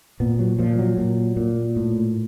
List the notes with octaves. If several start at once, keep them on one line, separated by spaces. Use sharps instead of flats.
A#2 B3
F#3
A#2 F3
F#3
A#2
A#2
A2